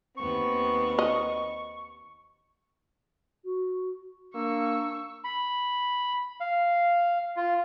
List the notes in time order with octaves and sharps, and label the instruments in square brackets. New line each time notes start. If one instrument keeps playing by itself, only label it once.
[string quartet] D#2 B3 C4 [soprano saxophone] C#6
[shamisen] D#5
[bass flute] F#4
[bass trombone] A#3 [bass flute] D4 [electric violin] C#6 E6
[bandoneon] B5
F5
F4